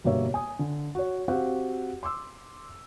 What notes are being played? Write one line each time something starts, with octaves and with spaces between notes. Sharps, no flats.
G1 G2 B2 A#3 C#5 E5
G#5 D#6
D3
F#4 C#5
C4 F#4 G4 F5 F#5
C6 D6 E6